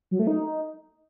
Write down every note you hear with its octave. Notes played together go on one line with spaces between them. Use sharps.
F#3
A3
D#4